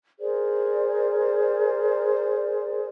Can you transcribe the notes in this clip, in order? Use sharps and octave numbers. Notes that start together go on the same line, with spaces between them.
G#4 A#4 C5 D5